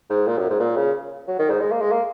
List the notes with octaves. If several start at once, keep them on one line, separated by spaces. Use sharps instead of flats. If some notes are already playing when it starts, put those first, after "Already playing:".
G#2
A#2
F#2
G#2
A#2
C#3
F#3
D#3
G#2
G#3
A#3
G#3
A#3